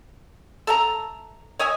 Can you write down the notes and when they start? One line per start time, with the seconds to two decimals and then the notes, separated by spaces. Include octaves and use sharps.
0.67 A4 E5 A#5
1.59 C#5 D#5 E5 G#5